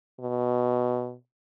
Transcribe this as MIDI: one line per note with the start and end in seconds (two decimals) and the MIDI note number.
0.19 1.15 47